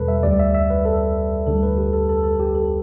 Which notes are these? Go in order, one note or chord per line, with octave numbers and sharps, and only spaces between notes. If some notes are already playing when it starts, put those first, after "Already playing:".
Already playing: E2 B2 G3 A4 B4
E5
D2 D3 G3 D5
E5
E5
B4
A4
D2 D3 G3 A4
B4
G4
A4
A4
A4
G4
A4